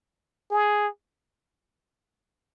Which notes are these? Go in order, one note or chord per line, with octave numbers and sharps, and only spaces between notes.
G#4